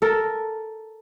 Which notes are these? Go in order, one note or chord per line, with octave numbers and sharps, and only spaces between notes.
A4 A#4